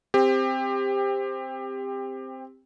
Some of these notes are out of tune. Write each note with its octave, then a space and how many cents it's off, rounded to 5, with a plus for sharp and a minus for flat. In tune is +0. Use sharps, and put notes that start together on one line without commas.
C4 +0 G4 +20